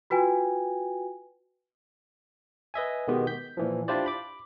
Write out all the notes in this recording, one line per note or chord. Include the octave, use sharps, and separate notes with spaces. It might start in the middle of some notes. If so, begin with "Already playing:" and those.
F4 F#4 B4 G5 G#5
B4 D#5 E5 G#5
B2 D#3 G#3 B3 G4
G6 B6
A#2 E3 F3
D4 E4 F4 G4 C5 D5
B5 D6